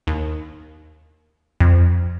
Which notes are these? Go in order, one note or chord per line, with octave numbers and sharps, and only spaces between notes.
D#2
F2